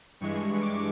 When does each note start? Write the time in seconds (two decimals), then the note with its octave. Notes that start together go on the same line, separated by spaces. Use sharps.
0.21 G2 E3 G#3 C#6
0.61 D6